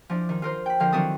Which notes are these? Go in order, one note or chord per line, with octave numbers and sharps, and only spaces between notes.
F3 D4 E4
D#3
F4 A#4 C5
G5 B5
D3 F3 A#4 F5 G6
D#3 F#3 C4 E4 A4 D#6